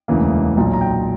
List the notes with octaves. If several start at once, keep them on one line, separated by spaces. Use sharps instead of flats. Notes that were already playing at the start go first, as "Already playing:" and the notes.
E1 D2 C#3 E3 A#3
B1 A#2 F#3 A#5
A#5
G5